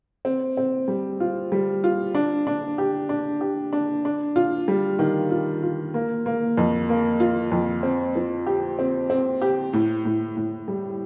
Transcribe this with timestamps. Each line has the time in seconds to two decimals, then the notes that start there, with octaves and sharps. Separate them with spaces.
0.25 C4
0.57 C4
0.88 G3
1.20 F4
1.52 G3
1.84 F4
2.15 D4
2.47 D4
2.78 G4
3.09 D4
3.41 G4
3.73 D4
4.05 D4
4.36 F4
4.68 G3
4.99 D#3
5.31 F4
5.62 F4
5.94 A#3
6.26 A#3
6.58 F2
6.89 A#3
7.20 F4
7.52 F2
7.83 C4
8.16 F3
8.46 G4
8.79 C4
9.10 C4
9.42 G4
9.73 A2
10.05 A2
10.37 A2
10.68 G3